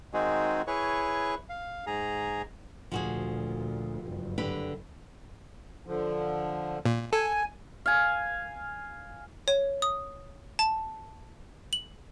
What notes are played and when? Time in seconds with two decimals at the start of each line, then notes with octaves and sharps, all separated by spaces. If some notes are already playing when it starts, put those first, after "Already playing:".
0.13 D#3 G#3 C4 D#4 F#4 G#4
0.67 E4 G#4 B4 C#5 C#6
1.49 F5
1.87 G#2 G#4 A#5
2.92 D2 A#2 F3 F#4 G#4
4.00 F#1 G2
4.38 D3 G4 B4
5.87 D3 F3
6.86 A#2
7.13 A4 G#5
7.86 F5 G#5
9.48 C#5
9.82 D#6
10.59 A5
11.73 F#7